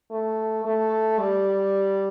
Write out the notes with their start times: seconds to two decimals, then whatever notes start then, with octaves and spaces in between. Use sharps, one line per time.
0.11 A3
0.65 A3
1.19 G3